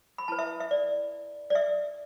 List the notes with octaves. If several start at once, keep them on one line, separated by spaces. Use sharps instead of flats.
B5
E4 B4 A5
E5
E5
D5
D5
E5